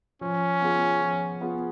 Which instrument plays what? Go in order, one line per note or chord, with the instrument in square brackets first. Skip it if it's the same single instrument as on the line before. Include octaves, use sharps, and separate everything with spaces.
[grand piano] F3 [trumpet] C#4
[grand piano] B3 F4 G#4
F3
B3 F4 G#4